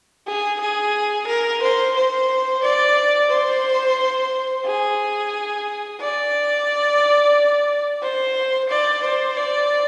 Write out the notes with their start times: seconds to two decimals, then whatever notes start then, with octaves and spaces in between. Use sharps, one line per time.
0.27 G#4
0.61 G#4
1.27 A#4
1.62 C5
1.96 C5
2.63 D5
3.30 C5
4.65 G#4
6.00 D5
8.02 C5
8.69 D5
9.03 C5
9.37 D5